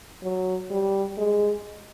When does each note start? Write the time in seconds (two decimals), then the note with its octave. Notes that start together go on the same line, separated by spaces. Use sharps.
0.23 F#3
0.70 G3
1.18 G#3